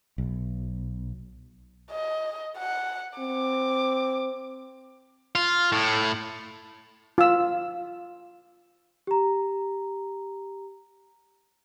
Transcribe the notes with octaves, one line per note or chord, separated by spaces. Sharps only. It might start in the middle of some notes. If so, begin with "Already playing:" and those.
B1
D#5
F#5
C4 D6
F4
A2
F4 E6
G4 A#5